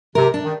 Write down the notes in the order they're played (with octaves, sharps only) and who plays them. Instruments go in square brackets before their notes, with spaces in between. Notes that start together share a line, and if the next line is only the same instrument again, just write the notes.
[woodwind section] C3 [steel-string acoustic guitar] A#4
[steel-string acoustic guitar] D4
[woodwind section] D#3